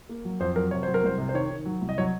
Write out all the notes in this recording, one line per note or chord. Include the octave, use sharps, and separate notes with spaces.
A#3
F#3
F2 C5
F#3 A#4
C3 C#5
F#3 C5
A#4
C2 C5
C3
C5
D#3 C#5
D#3
F#3
C2
D#5
F#3 C#5